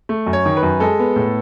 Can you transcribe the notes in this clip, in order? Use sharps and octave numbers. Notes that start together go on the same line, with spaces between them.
A3
F#2
C#5
D#3
B4
F#2
G#3 A4
B3
A2